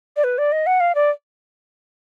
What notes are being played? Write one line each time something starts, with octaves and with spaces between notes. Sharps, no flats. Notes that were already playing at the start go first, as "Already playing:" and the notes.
D5
B4
D5
D#5
F#5
F5
D5